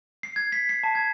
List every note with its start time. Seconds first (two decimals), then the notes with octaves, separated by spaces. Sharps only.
0.23 C7
0.36 G#6
0.52 B6
0.69 C7
0.84 A5
0.95 G#6